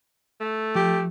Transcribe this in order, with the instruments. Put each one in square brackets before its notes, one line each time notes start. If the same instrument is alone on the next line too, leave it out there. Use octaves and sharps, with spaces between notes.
[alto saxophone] A3
[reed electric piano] F3 [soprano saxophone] G4